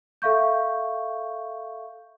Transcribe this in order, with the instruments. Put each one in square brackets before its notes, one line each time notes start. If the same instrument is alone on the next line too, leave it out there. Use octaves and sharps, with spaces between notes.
[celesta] A4 E5 F5 C#6 G6